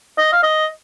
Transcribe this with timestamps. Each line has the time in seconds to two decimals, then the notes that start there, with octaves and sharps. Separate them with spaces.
0.18 D#5
0.32 F5
0.43 D#5